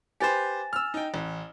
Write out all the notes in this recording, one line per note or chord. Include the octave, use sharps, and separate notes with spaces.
G4 B4 C5 G#5 A6
E6 F6
D#4 G5
A1